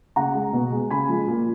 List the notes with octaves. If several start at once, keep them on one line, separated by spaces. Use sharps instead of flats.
C#3 F#5 A#5
G#3
B2
G#3
C#3 G#5 B5
F3 G#3
A#2